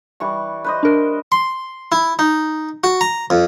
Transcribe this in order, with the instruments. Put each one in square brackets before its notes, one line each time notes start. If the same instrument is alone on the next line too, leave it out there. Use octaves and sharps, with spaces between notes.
[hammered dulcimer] E3 G3 C#6
B4 C5 D#5
[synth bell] D4 A#4
[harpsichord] C6
E4
D#4
F#4
A#5
F2